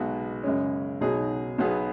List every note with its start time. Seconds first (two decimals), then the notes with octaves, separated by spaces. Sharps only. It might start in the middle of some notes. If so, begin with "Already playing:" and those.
Already playing: B1 B2 G#3 B3 F#4
0.43 F#2 C#3 G#3 C#4
1.00 B1 B2 F#3 D#4 G#4
1.58 B1 B2 F#3 B3 G#4